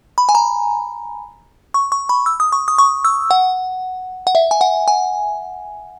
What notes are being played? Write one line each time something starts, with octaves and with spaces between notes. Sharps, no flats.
B5
G#5
A#5
C#6
C#6
B5
E6
D#6
C#6
D#6
C#6
E6
F#5
F#5
E5
G#5
F#5
G#5